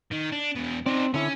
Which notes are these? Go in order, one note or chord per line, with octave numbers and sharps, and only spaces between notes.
D#3
D4
E2 B2
C4 D#4 D5
D3 C#4 E4